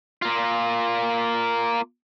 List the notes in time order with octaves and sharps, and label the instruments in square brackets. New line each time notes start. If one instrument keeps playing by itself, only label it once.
[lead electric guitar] A#3 F4